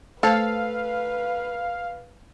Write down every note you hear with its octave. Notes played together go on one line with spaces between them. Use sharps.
A3 A4 B4 C5 F5 A5